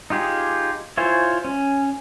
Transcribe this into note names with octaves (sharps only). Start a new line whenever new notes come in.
D#4 F4 G4 G#4
E4 F4 C5 C#5 G#5
C#4